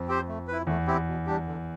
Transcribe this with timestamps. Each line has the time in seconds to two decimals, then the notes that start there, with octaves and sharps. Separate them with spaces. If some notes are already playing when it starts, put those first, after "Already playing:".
Already playing: F2
0.08 C4 G4 C5
0.28 A3
0.48 E4 B4
0.67 E2 A3
0.87 C4 E4 G4
1.07 B2
1.26 G3 D4 G4
1.46 D3